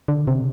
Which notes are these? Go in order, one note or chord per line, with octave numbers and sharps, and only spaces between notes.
D3
C3